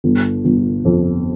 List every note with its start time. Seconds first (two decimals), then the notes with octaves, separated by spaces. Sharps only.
0.04 G1
0.45 G1
0.85 F2